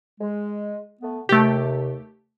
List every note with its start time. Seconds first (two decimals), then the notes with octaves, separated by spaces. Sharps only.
0.20 G#3
1.02 A3 B3
1.29 D#2 C3 A3 G4